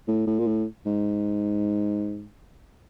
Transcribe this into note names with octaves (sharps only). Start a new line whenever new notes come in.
A2
A2
A#2
A2
G#2